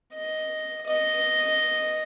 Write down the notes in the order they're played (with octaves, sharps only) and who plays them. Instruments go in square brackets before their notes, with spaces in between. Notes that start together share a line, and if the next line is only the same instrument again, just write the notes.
[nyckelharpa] D#5
D#5